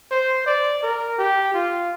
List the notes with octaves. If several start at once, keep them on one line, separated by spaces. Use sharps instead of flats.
C5
D5
A#4
G4
F4